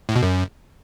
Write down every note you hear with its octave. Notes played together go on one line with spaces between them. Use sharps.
A2
B2
F#2